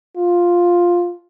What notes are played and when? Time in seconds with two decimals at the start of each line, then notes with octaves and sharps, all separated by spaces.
0.17 F4